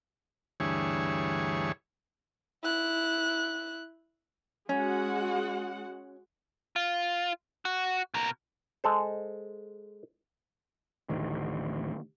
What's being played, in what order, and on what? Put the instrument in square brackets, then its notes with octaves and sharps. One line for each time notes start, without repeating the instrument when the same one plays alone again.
[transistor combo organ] D2 G2 E3 G#4 C#5
[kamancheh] E4 F#6
[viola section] G#3 F#4 F#5 [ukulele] C#4
[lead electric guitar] F4
F#4
B2 A#4
[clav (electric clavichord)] G#3 A4 C5
[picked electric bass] A1 D2 D#3